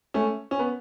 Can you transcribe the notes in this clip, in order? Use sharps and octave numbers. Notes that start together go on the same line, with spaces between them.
A3 C#4
C#4
B3